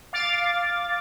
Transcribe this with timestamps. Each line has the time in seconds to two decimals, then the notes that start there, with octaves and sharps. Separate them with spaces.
0.13 F5 D6 A6